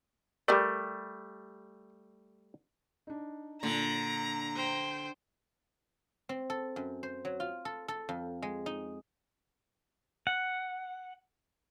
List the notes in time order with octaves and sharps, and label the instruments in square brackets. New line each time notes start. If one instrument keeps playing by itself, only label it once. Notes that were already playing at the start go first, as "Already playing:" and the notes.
[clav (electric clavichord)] G3 A3 [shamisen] G4 A#4 D5
[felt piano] D4 D#4
[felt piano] A#2 [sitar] D3 [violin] A#5
[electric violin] C5 G5
[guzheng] C4
A4
F#2
C5
F#3
F4
A4
A4
F2
G#3
D#4
[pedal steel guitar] F#5